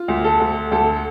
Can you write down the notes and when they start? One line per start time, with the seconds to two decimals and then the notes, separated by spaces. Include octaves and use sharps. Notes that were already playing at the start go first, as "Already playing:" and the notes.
Already playing: F4
0.08 D2
0.24 A4
0.40 D2
0.71 D2 A4